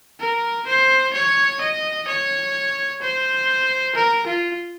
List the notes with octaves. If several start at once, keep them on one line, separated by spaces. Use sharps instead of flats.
A#4
C5
C#5
D#5
C#5
C5
A#4
F4